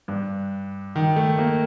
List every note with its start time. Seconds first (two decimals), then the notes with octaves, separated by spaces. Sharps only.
0.08 G2
0.96 D#3
1.16 A3
1.38 A#3